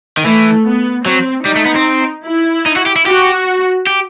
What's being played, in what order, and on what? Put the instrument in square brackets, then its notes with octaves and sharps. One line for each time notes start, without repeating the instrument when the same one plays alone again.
[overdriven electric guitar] D#3
[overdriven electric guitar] E3 [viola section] A3
[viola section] B3
[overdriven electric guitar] F#3 [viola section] C4
[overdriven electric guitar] G3 [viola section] D#4
[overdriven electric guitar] A3
B3
C4
[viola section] E4
[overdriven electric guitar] D#4
F#4
G4
E4
[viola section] F#4 [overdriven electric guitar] G4
[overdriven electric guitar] G4